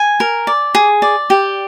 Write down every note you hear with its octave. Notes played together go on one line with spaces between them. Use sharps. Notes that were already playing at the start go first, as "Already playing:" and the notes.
Already playing: G#5
A#4
D5
G#4
D5
G4